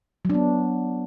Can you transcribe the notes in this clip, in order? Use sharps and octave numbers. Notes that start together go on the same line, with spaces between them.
F#3 B3 D4